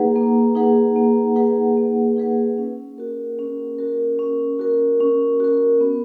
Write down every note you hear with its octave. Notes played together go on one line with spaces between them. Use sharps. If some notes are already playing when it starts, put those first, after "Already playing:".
Already playing: A#3 D#4 G#4 B4 F#5
A#3
D#4 G#4 B4 F#5
A#3
D#4 G#4 B4 F#5
A#3
D#4 G#4 B4 F#5
C#4
F#4 A#4
C#4
F#4 A#4
C#4
F#4 A#4
C#4
F#4 A#4
B3